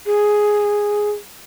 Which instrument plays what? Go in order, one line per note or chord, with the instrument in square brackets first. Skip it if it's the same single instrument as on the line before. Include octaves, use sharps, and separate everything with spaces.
[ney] G#4